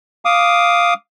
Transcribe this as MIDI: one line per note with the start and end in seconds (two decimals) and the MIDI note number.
0.25 0.94 77
0.25 0.94 86
0.25 0.94 87